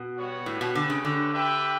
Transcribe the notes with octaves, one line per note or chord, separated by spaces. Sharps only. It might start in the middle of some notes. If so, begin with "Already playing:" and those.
Already playing: B2
G3 B3 F#4 C#5 F#5
A2
B2
D3 A3 C#4 G4 B4
C#3
D3
D4 G4 B4 E5 G5